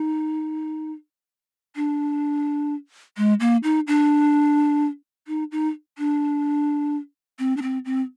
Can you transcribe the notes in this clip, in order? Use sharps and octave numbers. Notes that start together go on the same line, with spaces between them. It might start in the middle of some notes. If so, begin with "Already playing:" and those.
Already playing: D#4
D4
G#3
A#3
D#4
D4
D#4
D#4
D4
C4
D4
C4
C4